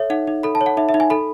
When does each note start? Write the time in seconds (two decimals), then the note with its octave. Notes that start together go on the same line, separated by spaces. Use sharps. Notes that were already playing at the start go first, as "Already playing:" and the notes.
Already playing: A4 C#5 E5
0.10 D#4 F#5
0.27 D#4
0.43 A4 B5
0.55 A5
0.61 C#5
0.66 F#5
0.77 D#4 E5
0.89 E5
0.94 D#4
1.00 G#5
1.10 A4 B5